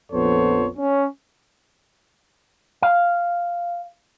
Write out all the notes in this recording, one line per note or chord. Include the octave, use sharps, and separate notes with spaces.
A#1 F2 B3 A4 C5 C#5
C#4
F5